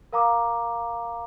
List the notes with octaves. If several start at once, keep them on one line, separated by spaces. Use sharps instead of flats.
A#4 F5 A#5 D6